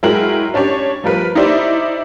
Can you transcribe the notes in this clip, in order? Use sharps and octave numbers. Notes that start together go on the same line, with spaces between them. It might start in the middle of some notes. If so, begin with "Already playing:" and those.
F#3 G#3 E4 A#4 G5 F#7
C#4 D4 G4 C#5
F3 G3 A#4 B4
D#4 E4 G4 C5 D5 E5